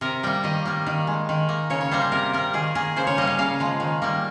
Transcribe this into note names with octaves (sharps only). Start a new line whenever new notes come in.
C3 A#4
G3 A#3 G5
D#3 D#5
G3 A#3
D#3
G#3
D#3
A#3
C#3 C#5
C#5
G3 A#3 C5
C5
C3 A#4
G3 A#3 A#4
D#3 G#4
A#3 G#4
C#3 C5
C#5
G3 A#3 D#5
F5
C#3 F5
F3 G#3
D#3
G3 A#3